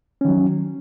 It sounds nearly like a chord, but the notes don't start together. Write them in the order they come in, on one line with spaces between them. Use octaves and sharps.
C#4 D#3 F#3